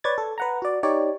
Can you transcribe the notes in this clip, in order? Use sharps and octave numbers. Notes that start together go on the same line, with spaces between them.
B4 C#5 D5 G#6 A6
A4
B4 F#5 A#5
F#4 D5
D#4 G4 C#5 D5